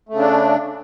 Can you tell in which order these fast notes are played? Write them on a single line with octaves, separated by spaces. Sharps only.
A3 C#3 D4